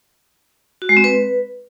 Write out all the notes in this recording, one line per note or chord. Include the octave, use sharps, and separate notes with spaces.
F#4
G#3
C4
B4